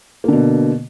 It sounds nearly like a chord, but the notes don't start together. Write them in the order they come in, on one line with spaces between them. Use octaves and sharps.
A#3 D3 B2